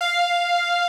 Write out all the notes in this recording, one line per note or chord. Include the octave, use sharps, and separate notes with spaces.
F5